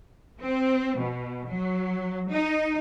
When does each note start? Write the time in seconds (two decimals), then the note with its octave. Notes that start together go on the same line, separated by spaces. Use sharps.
0.41 C4
0.99 B2
1.48 F#3
2.30 D#4